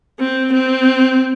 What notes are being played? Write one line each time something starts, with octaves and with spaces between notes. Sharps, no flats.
C4
C4